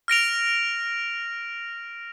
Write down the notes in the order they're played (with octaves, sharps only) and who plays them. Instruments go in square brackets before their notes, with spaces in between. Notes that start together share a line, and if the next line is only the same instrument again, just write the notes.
[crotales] F6 A#6 D7 F7